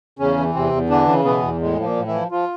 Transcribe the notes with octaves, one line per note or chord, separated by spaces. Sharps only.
E2 C#3 C#4
E3
E2 C3 C4
E2
D3 E3 D4
C#3
B2 E3 B3
E2
A2 G#3
F3
A#2 A#3
A2
E3 E4
F3
F3 F4